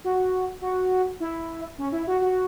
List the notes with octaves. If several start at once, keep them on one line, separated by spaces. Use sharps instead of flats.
F#4
F#4
E4
C#4
E4
F#4
F#4